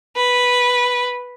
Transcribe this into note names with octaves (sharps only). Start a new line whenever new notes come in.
B4